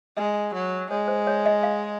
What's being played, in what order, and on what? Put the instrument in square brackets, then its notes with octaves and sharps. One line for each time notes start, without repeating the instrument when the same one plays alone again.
[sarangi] G#3 [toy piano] D#5
[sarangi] F#3
[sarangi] G#3 [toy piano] C#5
[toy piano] C5
C#5
D#5
F5